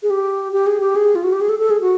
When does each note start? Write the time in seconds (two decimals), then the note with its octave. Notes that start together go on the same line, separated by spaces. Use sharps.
0.03 G#4
0.10 G4
0.53 G4
0.67 G#4
0.80 G4
0.96 G#4
1.15 F4
1.24 F#4
1.32 G4
1.41 G#4
1.49 A4
1.59 A4
1.70 G#4
1.81 F#4